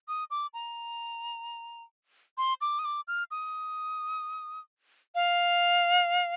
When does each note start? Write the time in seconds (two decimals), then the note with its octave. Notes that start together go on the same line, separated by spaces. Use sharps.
0.08 D#6
0.31 D6
0.54 A#5
2.38 C6
2.61 D6
2.79 D#6
2.85 D6
3.08 F6
3.31 D#6
5.15 F5